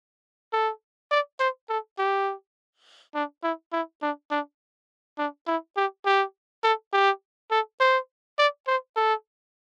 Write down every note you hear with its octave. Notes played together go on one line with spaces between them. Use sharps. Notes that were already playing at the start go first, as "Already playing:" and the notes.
A4
D5
C5
A4
G4
D4
E4
E4
D4
D4
D4
E4
G4
G4
A4
G4
A4
C5
D5
C5
A4